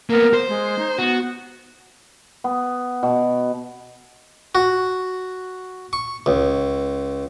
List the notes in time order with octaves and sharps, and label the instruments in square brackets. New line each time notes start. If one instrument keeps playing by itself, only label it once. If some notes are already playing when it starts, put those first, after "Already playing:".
[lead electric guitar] A#3 B3 [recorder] A#4
[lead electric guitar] C5
[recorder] G#3
D#4
[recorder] B3 [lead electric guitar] F#4
[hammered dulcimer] B3
B2
[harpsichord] F#4
C#6
C#2